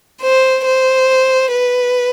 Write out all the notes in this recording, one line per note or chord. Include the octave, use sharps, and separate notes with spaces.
C5
C5
B4